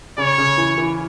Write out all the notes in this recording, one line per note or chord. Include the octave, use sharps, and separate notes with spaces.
C#3 C#5
C#3
E3
E3